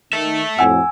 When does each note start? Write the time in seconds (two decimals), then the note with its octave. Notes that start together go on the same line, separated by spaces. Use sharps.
0.13 D#3 A4 E5
0.59 F2 A2 F#4 F#5 G#5 E6